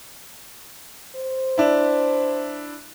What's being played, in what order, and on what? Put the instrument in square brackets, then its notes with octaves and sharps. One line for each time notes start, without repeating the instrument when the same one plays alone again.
[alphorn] C5
[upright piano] D4 E4